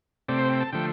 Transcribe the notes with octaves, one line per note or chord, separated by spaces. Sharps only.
C3 A3 C4 D5
C5
G5
A5
D3 F3 A3 G5